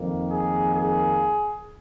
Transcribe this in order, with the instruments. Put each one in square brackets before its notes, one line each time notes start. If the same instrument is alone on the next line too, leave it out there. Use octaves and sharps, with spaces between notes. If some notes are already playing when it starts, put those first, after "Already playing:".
Already playing: [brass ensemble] F2 D#3 A#3
G#4
G#4